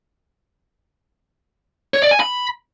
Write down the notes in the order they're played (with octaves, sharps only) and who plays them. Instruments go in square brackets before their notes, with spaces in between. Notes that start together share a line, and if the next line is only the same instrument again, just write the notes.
[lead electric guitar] C#5
D5
G#5
B5